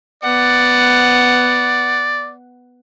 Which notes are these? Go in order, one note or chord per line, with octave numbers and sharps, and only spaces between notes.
B3 D5 F#5